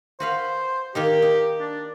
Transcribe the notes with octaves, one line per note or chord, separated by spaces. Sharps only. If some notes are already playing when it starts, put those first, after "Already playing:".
F#4 B4 C5 F5
D#3 A#3 D#4 G4
D#4
D4